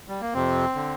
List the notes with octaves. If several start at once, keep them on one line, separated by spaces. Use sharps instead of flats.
G3
A#3
F2 C3 C4
D3